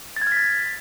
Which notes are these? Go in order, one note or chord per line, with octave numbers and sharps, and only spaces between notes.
A6
G#6
F6
B6
A6